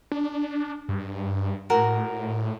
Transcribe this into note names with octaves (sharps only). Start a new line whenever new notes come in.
D4
G2
A2 F#4 A#4